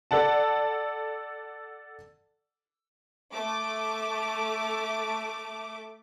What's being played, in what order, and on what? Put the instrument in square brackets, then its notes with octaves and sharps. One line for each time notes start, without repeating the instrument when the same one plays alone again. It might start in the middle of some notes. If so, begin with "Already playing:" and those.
[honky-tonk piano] A4 D5 F#5 A5
[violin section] A3 D6